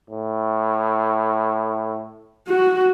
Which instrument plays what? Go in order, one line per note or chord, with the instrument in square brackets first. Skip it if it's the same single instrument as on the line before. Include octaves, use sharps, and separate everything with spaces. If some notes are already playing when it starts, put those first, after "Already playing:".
[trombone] A2
[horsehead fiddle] F#4